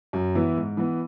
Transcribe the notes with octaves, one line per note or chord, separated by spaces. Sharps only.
F#2
E3 B3 E4
G#2
E3 B3